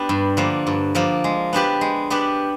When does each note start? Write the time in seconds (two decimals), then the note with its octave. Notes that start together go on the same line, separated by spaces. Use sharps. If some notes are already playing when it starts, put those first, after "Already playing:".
Already playing: B3 D4 G4
0.09 G2
0.37 D3 F3 A#3
0.67 G2
0.95 D3 F3 A#3
1.24 G#3
1.53 B3 D4 G4 B4
1.81 G#3
2.10 B3 D4 G4 B4